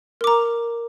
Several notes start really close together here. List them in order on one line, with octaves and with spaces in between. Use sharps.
A#4 D6 A#5